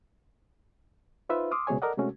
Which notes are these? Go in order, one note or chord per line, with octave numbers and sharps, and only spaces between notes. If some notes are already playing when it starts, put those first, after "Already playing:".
D#4 F4 B4 C5 E5
C6 D6 D#6 F6
C#2 B2 G#4 C#5 G#5
A4 A#4 D5 D#5 F#5
C3 G#3 A3 C#4 F#4 A4